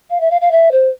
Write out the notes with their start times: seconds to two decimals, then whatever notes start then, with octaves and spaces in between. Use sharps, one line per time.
0.10 F5
0.20 E5
0.30 F5
0.41 F5
0.51 E5
0.71 C5